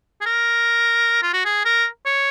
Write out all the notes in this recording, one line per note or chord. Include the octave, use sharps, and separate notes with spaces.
G#4
A#4
F4
F#4
G#4
A#4
C#5